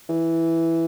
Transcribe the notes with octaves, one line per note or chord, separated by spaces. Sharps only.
E3